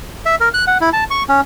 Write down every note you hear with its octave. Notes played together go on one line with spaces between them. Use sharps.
E5
A#4
F#6
F#5
E4
A5
C#6
C#4